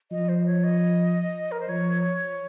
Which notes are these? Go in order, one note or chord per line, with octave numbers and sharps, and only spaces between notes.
F3 D#5
C5
C#5
D#5
A#4
C5
F3 C#5